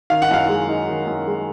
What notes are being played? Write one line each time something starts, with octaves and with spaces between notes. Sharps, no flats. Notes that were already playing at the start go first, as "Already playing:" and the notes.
D#3 F5
F#5
F#2 F5
G#3
D#4
D#3
F#2
G#3